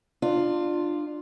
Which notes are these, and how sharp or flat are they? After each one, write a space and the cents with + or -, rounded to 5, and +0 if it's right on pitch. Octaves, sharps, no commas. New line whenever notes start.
D4 +30 F4 +0